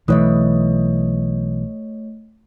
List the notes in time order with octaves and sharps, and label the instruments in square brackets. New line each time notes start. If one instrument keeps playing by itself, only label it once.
[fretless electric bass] B1 E3 [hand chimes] A3 C#5 D#5